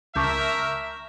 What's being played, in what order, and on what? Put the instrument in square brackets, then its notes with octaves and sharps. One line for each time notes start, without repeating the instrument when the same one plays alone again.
[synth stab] C#2 A5 [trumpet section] A#4 E5 [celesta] C#6 D6 G6